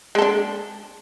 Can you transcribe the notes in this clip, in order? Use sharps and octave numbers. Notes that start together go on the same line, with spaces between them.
G#3 D4 A4